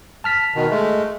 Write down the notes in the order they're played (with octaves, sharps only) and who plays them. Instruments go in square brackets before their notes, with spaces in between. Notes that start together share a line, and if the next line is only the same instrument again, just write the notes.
[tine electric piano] A5 F6 B6
[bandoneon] B2 D#3
G#3 A3